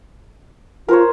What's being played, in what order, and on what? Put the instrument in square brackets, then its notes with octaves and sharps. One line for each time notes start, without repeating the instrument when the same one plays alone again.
[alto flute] F4 [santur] A#4 C5 C#5